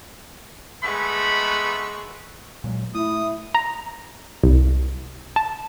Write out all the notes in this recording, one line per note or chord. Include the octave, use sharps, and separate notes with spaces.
G#3 A3 B3 B5 C#6
A#2 F#3 G#3
A3 E4 D#6
A#5
C2
A5